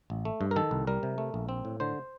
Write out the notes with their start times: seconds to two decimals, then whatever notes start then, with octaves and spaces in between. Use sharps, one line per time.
0.10 A1
0.25 A3
0.41 G2
0.51 A#4
0.56 D#3 A4
0.71 C2
0.87 G3 A#4
1.03 C3
1.18 A3
1.34 A#1
1.49 C4
1.65 A2
1.80 D3 C5